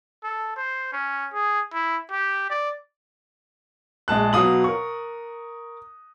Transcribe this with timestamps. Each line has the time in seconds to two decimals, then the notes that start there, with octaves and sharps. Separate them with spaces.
0.24 A4
0.56 C5
0.92 C#4
1.33 G#4
1.73 E4
2.11 G4
2.50 D5
4.08 A#1 G#3 A5 F#6
4.33 B2 F#3 F5 D#6 F#7
4.64 A#4 C#6